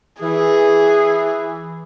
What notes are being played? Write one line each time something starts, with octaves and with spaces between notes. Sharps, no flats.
E3 G#4